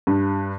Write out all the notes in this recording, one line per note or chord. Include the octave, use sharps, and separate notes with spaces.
G2